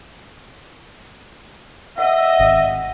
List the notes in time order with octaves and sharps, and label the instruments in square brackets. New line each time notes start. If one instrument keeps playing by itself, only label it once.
[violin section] D#5 [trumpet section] E5 [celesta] F#5
[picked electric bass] G#1